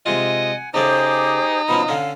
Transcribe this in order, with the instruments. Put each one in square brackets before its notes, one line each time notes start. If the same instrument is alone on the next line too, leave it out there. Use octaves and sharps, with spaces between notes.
[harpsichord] C3 G#3 F4 [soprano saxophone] D#5 [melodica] F#5 G#5
[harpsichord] C#3 A3 D5 [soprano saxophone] D#4 [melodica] G4 G#4 D6 [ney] C5
[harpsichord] B2 F3 C#4 [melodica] D#5 F5 D#6 [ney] B5
[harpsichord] D3 C#4 [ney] F5 [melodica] E6